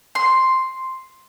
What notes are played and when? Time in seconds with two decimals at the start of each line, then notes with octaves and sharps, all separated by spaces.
0.15 C6